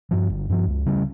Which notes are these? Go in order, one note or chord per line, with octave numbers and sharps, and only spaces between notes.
G2 F3
G1
G2 F3
C#2
C#3 G3 C#4